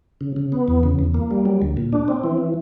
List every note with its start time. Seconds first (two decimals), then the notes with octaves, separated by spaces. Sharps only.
0.21 C#3
0.36 C#3
0.52 B3
0.68 E2
0.83 C#3
0.99 E2
1.14 A#3
1.31 G3
1.45 F#3
1.62 D2
1.77 A#2
1.93 D4
2.08 C4
2.24 E3